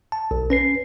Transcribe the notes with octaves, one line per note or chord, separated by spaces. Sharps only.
A5
B1
C#4 B4 C7